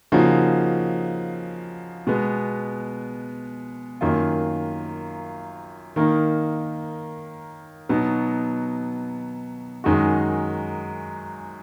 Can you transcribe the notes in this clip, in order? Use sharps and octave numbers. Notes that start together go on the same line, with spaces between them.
C#3 F3 A#3 D#4 F#4
B2 G#3 B3
F#2 D#3 A#3 F4
D#3 A#3 D#4
B2 F#3 B3 D#4
F#2 D#3 G#3 D#4 F#4